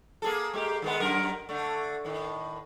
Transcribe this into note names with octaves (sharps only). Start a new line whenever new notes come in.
A#3 G#4 A4
G#3 A#3 G4
D#3 G#3 B3
F#2 A#4
D3 A3
A2 D#3